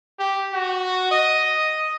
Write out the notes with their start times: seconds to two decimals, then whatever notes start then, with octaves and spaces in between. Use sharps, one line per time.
0.19 G4
0.53 F#4
1.12 D#5